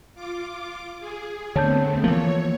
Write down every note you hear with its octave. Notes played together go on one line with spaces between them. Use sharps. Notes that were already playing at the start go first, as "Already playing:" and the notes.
F4 D6
G#4
D3 A3 B3 C4 C#5 A5 G6
E3 F3 A#3 C#5